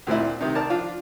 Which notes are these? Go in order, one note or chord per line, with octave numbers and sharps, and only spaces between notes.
D2 A#2 C4 E4
C3 D#3
A#4 C5 D5 A5
F3 D4 F4